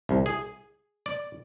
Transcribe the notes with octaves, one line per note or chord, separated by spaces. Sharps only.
C2
G#4
D5